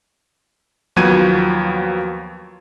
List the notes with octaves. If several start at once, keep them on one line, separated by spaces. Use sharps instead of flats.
D#2 F3 F#3 B3 G#6 D#7